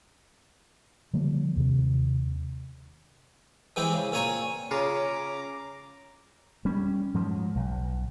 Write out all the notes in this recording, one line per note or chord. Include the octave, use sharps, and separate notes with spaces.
D3 F3 G3 A#3
D#2 C3
E3 G#3 C4 E4 G4 C5
C#3
A#2 C4 C#5 G#5 A#5 C#6
C#3 C#4 F4 G#4 A#5 D6
G3 C#4
G#2 F3 F#3
B1